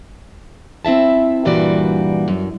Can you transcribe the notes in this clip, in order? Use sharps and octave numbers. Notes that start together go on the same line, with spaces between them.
C4 E4 E5 A5
G2 A#2 E3 G3 F#4 D5
F#2